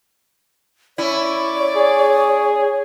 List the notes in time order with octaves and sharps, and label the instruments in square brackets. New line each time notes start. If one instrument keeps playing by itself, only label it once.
[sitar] C#4 E4 [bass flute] C#5 [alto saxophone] D5
[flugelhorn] G#4